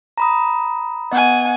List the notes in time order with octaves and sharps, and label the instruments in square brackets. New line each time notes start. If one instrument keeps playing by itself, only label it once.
[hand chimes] A#5 B5 D#6
[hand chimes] B3 D#5 [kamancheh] F#5 G#5